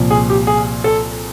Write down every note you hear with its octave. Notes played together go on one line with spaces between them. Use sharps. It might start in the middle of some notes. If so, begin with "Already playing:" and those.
Already playing: C2 A#2 F3
G#4
G4
G#4
A4